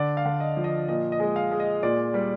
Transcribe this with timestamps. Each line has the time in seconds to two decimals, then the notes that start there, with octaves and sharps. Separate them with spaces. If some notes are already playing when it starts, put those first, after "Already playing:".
Already playing: D3 D5
0.17 F5
0.25 D3
0.40 D#5
0.57 F3
0.64 D#5
0.88 A#2 D#5
1.12 D#5
1.20 G#3
1.36 F5
1.51 G#3
1.60 D#5
1.83 A#2 D5
2.14 G3